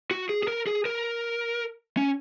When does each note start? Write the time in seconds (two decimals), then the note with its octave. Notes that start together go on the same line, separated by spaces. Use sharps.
0.11 F#4
0.29 G#4
0.43 G#4
0.48 A#4
0.67 G#4
0.85 A#4
1.97 C#4